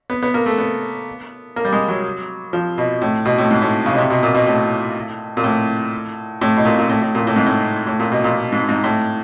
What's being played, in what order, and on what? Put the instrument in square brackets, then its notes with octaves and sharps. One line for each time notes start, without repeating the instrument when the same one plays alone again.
[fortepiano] B3
B3
A#3
A3
B3
A#3
G3
G#3
F#3
F3
B2
A2
B2
A2
G#2
A2
C#3
B2
C3
B2
A#2
B2
A2
A#2
A2
A2
B2
A#2
A#2
A2
A2
A#2
A2
G#2
A2
A2
A#2
B2
A#2
G#2
G#2
A2